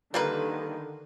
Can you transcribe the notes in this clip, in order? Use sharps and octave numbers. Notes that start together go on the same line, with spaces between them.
D3 D#3 G3 A#3 B4